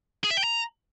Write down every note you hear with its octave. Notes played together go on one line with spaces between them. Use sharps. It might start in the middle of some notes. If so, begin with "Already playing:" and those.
G#4
E5
G5
A#5